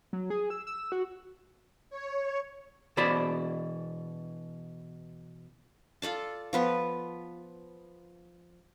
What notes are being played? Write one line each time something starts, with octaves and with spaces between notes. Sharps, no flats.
F#3
G#4
E6
E6
F#4
C#5
B2 E3 C5 D5 B5
F4 A4 D5 A5
F3 B3 B4